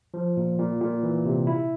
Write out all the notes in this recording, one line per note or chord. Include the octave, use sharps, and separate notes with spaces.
F3
A#2
A#2
A#2
E3
C3
E4